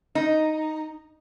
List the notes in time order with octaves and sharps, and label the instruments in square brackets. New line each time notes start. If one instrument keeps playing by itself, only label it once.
[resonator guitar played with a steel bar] D#4